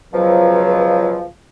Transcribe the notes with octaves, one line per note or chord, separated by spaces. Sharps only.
C#2 B2 F3 F#3